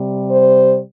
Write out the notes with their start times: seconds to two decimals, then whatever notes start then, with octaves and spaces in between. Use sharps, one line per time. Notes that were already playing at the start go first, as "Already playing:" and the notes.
Already playing: C3 G3
0.30 C5